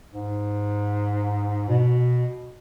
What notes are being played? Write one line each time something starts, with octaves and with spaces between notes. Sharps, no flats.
G#2
B2